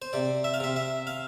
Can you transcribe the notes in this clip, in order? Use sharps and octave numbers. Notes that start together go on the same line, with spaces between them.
C5
C3 D5
E5
F5
C3 E5
E5
F5